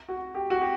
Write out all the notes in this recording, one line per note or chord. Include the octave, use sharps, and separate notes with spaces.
F#4
G4
F#4
G4